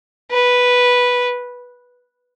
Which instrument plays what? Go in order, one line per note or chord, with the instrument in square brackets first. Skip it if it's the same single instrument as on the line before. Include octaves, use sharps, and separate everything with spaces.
[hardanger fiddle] B4